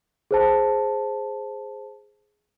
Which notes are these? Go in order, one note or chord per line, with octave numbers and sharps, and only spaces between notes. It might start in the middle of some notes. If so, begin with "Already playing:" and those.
G#4 C5 A5